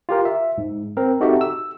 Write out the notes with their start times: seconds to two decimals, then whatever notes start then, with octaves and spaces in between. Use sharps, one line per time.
0.09 F4 G4 A#4
0.25 E5
0.58 G#2
0.97 C4 A#4
1.20 C4 D#4 F#4 G4 A4 E5
1.41 E6